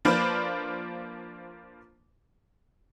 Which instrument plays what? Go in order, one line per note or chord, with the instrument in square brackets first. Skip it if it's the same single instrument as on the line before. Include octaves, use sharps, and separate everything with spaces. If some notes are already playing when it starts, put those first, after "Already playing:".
[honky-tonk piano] F3 A#3 D4 F4 B4 C5